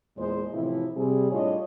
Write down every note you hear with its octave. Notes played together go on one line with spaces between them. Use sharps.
E2 A#2 G#3 C5
A2 C3 E3 F3 E4
C3 G3 G#4
A2 G3 D4 F4 C#5 D#5